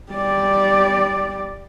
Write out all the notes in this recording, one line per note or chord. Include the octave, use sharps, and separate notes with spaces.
G3 D5